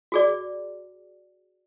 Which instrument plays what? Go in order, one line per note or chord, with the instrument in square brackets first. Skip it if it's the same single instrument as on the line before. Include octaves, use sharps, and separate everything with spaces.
[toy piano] F#4 G#4 D5